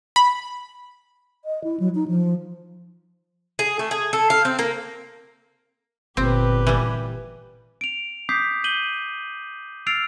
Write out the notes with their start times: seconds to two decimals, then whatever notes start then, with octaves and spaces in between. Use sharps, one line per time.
0.16 B5
1.45 D#5
1.64 E4
1.80 F#3
1.95 D#4
2.08 F3
3.59 G#4
3.79 A3
3.91 G#4
4.13 A4
4.30 F5
4.45 C4
4.59 A#3
6.17 G1 A#2 C4 G4 B4
6.67 E3 G3
7.81 D7 F7
8.29 D6 D#6 G6 B6 C7
8.64 G6 D#7 F#7 G7
9.87 E6 F6 A6 C7 D7 F7